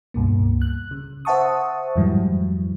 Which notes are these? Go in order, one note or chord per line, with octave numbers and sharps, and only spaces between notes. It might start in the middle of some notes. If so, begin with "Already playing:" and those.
C#2 G2 B2 A#3
F#6
C#3
C5 E5 F#5 A5 C#6 D#6
F2 G#2 E3 F#3 G3